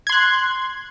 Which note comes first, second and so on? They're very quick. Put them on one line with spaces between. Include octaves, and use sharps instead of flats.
G#6 C6 F#6